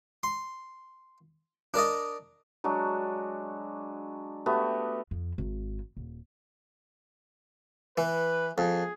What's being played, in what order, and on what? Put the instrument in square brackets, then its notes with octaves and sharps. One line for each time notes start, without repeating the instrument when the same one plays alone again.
[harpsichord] C6
D4 A#4 D5 D#5
[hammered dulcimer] F#3 G#3 D4 F#4
A3 B3 F#4 G4
[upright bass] F2
G#1
D#1
[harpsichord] E3 [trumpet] B4
[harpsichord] F2 [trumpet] G#4